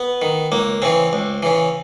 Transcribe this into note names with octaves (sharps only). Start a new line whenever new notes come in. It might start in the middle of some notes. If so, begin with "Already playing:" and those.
Already playing: B3
D#3
C#2 A#3
C#3 E3 C4
C#2
C#3 E3